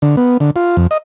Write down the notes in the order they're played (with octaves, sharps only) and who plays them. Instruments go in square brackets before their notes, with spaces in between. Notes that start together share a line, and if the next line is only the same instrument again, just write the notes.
[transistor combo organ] D3
B3
D3
F4
F2
D#5